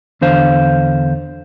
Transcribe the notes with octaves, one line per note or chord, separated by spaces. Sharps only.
E2 D3 C5 F5